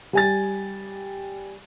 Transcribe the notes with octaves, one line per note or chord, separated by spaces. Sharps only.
G3 G#5 A6